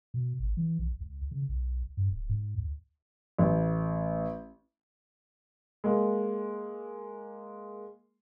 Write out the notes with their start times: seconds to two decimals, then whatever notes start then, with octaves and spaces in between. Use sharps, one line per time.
0.14 B2
0.40 G#1
0.57 E3
0.79 B1
1.00 C#2
1.31 C#3
1.49 B1
1.97 G2
2.11 D1
2.29 G#2
2.58 D2
3.38 A1
5.84 G#3 A#3